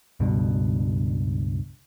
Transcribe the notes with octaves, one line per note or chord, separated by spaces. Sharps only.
C#2 G2 B2